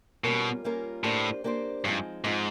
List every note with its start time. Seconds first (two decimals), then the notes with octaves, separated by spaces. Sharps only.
0.24 B2 G3 A#3 C#4 F4 A#4
0.64 G3 A#3 C#4 F4 A#4
1.04 A2 A#3 D4 G4 C5
1.44 A#3 D4 G4 C5
1.85 G2 F3 G#3 C4 D#4
2.24 G#2 F3 G#3 C4 D#4